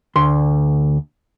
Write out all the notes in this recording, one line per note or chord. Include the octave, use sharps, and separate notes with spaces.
D2 C6